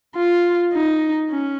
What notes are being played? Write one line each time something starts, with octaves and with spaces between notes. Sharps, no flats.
F4
D#4
C#4